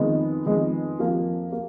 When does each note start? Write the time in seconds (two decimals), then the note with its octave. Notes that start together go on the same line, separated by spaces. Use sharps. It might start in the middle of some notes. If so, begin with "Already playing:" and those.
Already playing: F2 D#3 G#3 B3
0.46 F2 D#3 G#3 B3
0.99 F2 F3 A#3
1.52 A#3